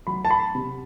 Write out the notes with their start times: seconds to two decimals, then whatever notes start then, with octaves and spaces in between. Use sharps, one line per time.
0.07 F#3 B5
0.25 A5
0.30 B5
0.55 C3